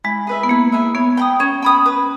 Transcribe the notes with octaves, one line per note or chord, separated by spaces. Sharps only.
G#3 E4
G#4 B4 E5
B3
A#3 E4
G#4 B4 E5
B3 C#5
G5 B5 D#6
C#4 C#5
G5 B5 D#6
B4